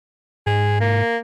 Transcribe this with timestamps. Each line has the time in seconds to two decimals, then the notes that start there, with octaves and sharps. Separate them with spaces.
0.47 G#2 G#4
0.80 A#3